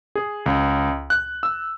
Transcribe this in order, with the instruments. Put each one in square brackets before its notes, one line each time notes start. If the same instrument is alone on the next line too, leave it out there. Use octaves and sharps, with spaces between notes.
[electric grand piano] G#4
C#2
F#6
E6